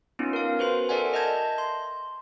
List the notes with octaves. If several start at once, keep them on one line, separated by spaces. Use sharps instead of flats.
B3 C#4 D#4 F4
A#4 F5
F#4 B4 C5 C6
A4 A#4 D5 E5 F#5 G#5
D#5 E5 A5 G6 G#6 A#6
C6